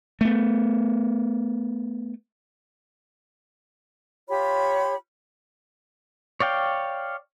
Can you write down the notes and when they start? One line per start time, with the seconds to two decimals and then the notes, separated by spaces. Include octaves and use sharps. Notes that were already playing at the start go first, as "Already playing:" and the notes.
0.21 A3 B3
4.27 F4 G4 C#5 B5
6.40 C#5 D5 F5 G5